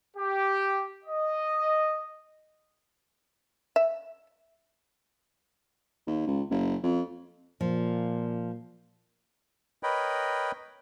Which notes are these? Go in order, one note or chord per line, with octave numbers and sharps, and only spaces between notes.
G4
D#5
E5
D#2
C#2
F#1
F2
A#2 F3
A#4 B4 C#5 D#5 G5 B5